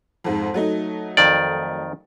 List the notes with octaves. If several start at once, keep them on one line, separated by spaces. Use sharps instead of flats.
F2 G#2
F#3 A3 D#4
F2 D#3 D5